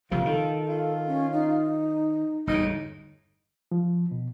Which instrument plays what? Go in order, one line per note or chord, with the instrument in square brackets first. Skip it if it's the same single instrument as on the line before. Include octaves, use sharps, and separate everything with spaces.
[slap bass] F#1 C3 F3 [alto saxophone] F4
[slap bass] D#3 [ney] A4
[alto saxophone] F4
[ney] C#4
D#4
[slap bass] G1 E2 A2 [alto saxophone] D#4
[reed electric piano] F3
B2